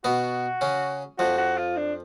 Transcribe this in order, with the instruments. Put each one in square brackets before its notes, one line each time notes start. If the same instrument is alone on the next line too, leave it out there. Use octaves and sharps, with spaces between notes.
[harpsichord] B2 B3 [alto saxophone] F#4
[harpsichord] C#3 C#4
[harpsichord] F2 F3 [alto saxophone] F#4
[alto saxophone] F#4
F4
D4